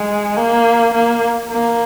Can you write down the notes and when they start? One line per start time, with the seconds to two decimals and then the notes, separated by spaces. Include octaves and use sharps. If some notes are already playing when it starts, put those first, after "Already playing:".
Already playing: G#3
0.37 A#3
0.94 A#3
1.50 A#3